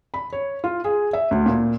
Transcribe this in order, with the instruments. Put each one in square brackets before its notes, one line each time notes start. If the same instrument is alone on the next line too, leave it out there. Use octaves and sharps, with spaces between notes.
[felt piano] B5
C#5
F4
G#4
E5
D2
A#2